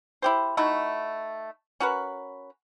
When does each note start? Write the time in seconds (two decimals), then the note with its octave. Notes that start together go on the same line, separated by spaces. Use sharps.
0.22 E4 G4 C5
0.57 A3 D#4 E4 F#4
1.80 C#4 F#4 A#4 B4